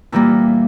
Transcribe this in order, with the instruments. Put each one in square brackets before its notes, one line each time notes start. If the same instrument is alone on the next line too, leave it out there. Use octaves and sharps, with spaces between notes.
[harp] A#2 E3 G3 A#3 E4